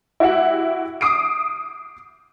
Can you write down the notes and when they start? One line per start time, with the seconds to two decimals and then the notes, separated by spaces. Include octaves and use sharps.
0.20 E4 F#4 G4 E5 F#5
1.01 D6 D#6 C7 D7